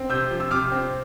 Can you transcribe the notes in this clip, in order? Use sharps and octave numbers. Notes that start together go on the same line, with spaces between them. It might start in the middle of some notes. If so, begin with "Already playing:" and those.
Already playing: C4
C3 E6 G6
F3
E6
C3 D6 F6
C4